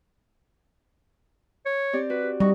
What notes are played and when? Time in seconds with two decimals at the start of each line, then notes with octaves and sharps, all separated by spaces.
1.66 C#5
1.93 C4 G4 D5
2.10 F#4 B4
2.40 G3 D#4 F#4